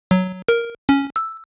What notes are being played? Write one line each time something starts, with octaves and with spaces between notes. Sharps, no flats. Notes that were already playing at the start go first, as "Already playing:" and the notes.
F#3
A#4
C#4
E6